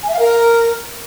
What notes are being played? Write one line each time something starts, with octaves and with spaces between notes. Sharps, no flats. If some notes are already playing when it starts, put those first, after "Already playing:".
G#5
E5
F5
A#4